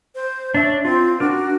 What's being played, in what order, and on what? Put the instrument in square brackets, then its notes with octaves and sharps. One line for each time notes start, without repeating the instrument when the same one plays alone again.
[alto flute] C5
[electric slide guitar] D4 E5 [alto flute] C#5
[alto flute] C4 [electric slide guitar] F4
[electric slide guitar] D4 A#4 [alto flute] F#4